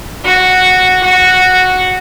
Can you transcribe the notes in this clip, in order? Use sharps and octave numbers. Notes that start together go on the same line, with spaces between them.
F#4
F#4